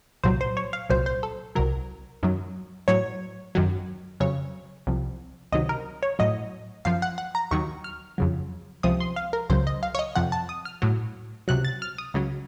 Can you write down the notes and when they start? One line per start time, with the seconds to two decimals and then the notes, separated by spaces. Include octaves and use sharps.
0.24 C2 A#2 F#3 C5
0.41 C5
0.57 C#5
0.73 F5
0.90 C2 A#2 F#3 C5
1.06 C5
1.23 A4
1.55 C2 C3 F#3 A#4
2.23 F#2 D#3 F#3
2.88 A2 F#3 C#5
3.55 F#2 D#3 F#3
4.20 F2 C#3 F#3 C#5
4.87 C2 C3 F3
5.52 C#2 C3 D#3 F#3 D#5
5.69 A#4
6.03 C#5
6.19 A2 F#3 D#5
6.85 F#2 F3 F5
7.02 F#5
7.18 F#5
7.35 A#5
7.51 D#2 D#3 F#3 C#6
7.84 F6
8.18 F2 C#3 F#3
8.83 C#2 C3 F3 D#6
9.00 C6
9.16 F5
9.33 A#4
9.50 C#2 C#3 F#3 C5
9.67 D#5
9.83 F5
9.95 C#5
9.99 D#5
10.16 F2 C3 F3 F#5
10.32 A5
10.49 D#6
10.65 F6
10.82 A2 F#3
11.48 C#2 C3 F#3 F#6
11.65 A6
11.82 F6
11.98 D#6
12.14 C#2 C#3 F#3